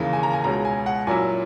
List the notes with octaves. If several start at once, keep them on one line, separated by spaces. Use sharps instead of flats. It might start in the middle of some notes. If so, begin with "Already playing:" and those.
Already playing: D#2 C#3 E3 A#3
G#5
A#5
G#5
C#2 B2 G#3 C#4 A#5
G#5
F#5
A#2 F#3 C#4 E4 G#5